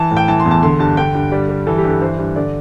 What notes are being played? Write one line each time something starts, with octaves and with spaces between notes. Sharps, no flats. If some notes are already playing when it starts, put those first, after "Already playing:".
Already playing: E3 A5
A2
G5
E3 A5
C6
E2
A5
D3 C6
G2 A5
D3 G5
G2
G3 D5
G3
E3 A4
G4
G2
A4
E3 C5
G2
D3 D5